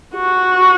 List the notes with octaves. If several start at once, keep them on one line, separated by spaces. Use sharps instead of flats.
F#4